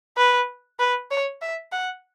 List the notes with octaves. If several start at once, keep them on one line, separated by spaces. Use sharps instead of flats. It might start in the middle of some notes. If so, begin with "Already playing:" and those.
B4
B4
C#5
E5
F#5